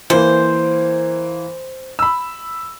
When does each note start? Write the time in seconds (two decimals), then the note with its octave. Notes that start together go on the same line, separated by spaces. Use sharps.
0.10 E3 A#3 C5
1.99 B5 E6